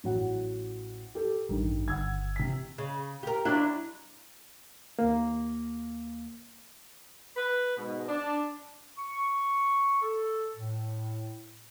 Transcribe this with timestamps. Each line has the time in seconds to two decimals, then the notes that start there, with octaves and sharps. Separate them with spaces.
0.04 A1 F#3 F#5
1.15 G4 A4
1.49 A1 G2 D#3
1.88 G1 F#5 E6 G#6
2.36 C3 B6
2.78 C#3
3.23 G4 A#4
3.45 F#3 D4 E4
4.99 D#2 A#3
7.37 B4
7.77 G#2 B2
8.08 D4
8.97 C#6
10.02 A4
10.55 A2